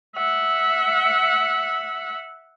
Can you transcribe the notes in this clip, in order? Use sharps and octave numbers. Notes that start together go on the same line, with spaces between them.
E5 F#5